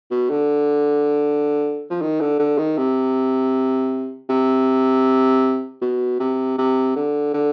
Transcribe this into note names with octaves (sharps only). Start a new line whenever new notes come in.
B2
D3
F3
D#3
D3
D3
D#3
C3
C3
B2
C3
C3
D3
D3